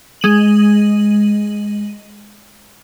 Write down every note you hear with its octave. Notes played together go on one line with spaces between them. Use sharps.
G#3 D#7 F#7